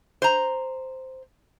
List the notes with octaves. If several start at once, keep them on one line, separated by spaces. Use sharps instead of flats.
C5 A#5